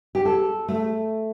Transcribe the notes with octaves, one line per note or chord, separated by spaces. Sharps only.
G4
A4
A3